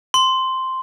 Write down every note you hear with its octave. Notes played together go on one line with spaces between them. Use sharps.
C6